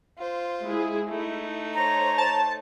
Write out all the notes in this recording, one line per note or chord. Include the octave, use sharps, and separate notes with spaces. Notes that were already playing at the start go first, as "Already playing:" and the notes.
F4 C5
G#3 E4 G#4
A3 D#4 E4
C5 C#5 A#5
A5